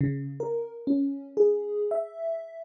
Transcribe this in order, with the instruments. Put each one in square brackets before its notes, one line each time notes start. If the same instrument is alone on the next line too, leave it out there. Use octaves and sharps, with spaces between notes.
[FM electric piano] C#3
A#4
C#4
G#4
E5